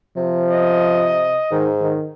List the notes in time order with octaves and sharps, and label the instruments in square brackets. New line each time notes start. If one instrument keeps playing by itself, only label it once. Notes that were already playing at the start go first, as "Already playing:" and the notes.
[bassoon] C3 [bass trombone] F3
[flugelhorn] D#5
[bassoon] G#2 [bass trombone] D#3
[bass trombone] D#3